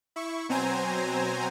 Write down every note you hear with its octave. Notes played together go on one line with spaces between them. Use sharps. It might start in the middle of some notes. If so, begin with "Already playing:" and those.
E4 C#6
B2 F#3 C4 C5 G#5 A#5